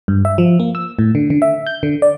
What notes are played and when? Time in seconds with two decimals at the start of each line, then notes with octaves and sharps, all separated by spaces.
0.08 G2
0.25 E5
0.38 F3
0.60 A#3
0.75 E6
0.99 A2
1.15 D3
1.30 D3
1.42 E5
1.67 G6
1.83 D3
2.02 D5